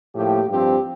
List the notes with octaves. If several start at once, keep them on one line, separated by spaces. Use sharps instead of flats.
A2 F3 A#3 G4
G2 F3 C4 G4